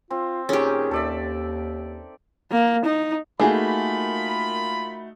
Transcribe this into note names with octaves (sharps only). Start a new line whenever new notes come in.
C4 F4
A#2 D#3 C#4 G4 G#4
D#2 A4 D5 E5
A#3
D#4
A3 A#3 D#4 F4 F#4 G#4 A#4 B5